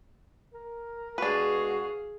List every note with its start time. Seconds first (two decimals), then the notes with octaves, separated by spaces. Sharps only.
0.54 A#4
1.18 B2 G#3 D4 F#4 G#4 B4 F5